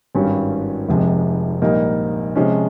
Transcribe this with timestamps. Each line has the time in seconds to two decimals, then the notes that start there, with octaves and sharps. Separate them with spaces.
0.15 G#1 G2 G3 C#4
0.89 F1 F2 C3 F3 G#3
1.62 A#1 G#2 G3 A#3 D#4
2.35 C3 F3 G#3 C#4